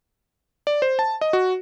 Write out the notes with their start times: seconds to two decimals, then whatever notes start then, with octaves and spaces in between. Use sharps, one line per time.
0.67 D5
0.82 C5
0.99 A5
1.21 D#5
1.33 F#4